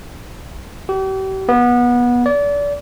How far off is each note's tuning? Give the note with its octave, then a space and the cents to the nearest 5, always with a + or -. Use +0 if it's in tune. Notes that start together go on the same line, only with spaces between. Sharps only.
G4 -40
B3 -25
D5 -30